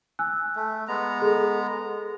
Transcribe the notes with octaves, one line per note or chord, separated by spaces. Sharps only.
G#5 E6 F#6
A3
G#3 B3 A#5
G#4 A4